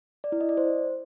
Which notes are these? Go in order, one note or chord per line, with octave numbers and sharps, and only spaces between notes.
D5
E4
D#5
D5
C5